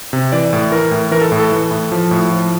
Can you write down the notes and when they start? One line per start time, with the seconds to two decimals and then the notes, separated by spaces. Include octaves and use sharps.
0.13 C3
0.32 E3 D5
0.53 A2
0.72 E3 A#4
0.91 A2
1.11 E3 A#4
1.21 A4
1.32 A2
1.40 A4
1.52 E3
1.71 A2
1.92 F3
2.11 A2
2.31 F3